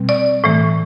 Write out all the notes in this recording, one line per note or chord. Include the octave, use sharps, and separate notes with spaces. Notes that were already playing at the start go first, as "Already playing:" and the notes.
Already playing: B2 G3 C4
D5
A2 E3 A3